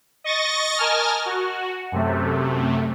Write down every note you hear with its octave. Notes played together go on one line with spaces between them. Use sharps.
D#5 C#6 A6 A#6
A#4 D#5 G#5 A5 F6
F#4
F#2 C3 A3